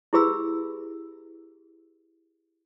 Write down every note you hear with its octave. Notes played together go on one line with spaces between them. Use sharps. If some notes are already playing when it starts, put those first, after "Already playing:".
E4 G4 G#4 B4 B5 E6